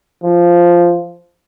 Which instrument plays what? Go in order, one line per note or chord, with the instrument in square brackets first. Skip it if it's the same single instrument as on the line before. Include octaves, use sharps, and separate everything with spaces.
[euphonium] F3